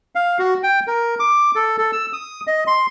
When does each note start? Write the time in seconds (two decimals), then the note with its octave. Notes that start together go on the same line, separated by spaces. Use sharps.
0.15 F5
0.39 F#4
0.63 G5
0.87 A#4
1.20 D6
1.55 A4
1.78 A4
1.92 E6
2.13 D#6
2.47 D#5
2.67 C6